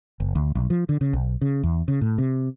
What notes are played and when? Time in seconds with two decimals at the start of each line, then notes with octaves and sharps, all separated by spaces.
0.20 F#1
0.35 D2
0.55 B1
0.70 F3
0.89 D3
1.01 C#3
1.13 B1
1.41 C#3
1.63 E2
1.88 C#3
2.01 A2
2.18 C3